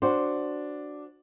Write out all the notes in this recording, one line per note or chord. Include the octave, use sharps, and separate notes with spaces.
D4 F#4 C5